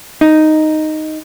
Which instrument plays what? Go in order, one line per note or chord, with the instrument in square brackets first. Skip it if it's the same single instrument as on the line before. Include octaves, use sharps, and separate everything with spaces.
[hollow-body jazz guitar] D#4